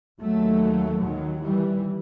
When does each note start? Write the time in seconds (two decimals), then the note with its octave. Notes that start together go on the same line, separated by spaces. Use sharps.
0.21 D#2 F#3 A3
1.01 D#3 F#3
1.42 E3 G3